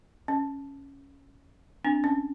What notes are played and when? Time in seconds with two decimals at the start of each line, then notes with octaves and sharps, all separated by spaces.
0.28 C#4
1.85 C4 D4
2.04 C#4